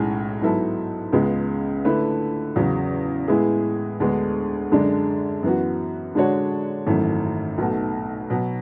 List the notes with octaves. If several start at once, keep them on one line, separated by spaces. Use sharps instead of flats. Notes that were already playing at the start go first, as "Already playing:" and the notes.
Already playing: B1 A2 G#3 C#4 G#4
G#2 F#3 B3 E4 A4
C#2 C#3 G#3 B3
D3 A3 E4 B4
E2 C#3 F#3
A2 G#3 B3 E4 G#4
D2 D3 G#3 B3
F#2 D3 G#3 D4
F#2 E3 B3 F#4
D3 G#3 D4 F#4 C#5
G#1 F#2 E3 A3
B1 B2 A3
B2 F#3 B3